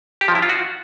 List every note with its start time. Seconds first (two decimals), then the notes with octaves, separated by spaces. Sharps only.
0.21 G4
0.28 F3
0.35 E4
0.42 F4
0.49 F#4